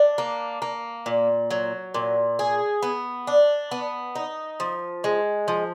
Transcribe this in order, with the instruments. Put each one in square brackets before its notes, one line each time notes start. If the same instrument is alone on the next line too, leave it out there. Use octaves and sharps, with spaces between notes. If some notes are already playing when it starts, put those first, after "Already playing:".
Already playing: [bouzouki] D4
A#3
A#3
A#2
F#3
A#2
G#4
B3
D4
B3
D#4
F3
G#3
F3